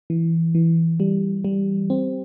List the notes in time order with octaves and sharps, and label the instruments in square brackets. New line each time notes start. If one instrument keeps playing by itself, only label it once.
[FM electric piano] E3
E3
G3
G3
C4